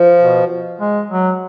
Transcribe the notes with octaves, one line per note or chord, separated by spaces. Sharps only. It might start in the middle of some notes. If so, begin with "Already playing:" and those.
Already playing: F3
B2
G#3
F#3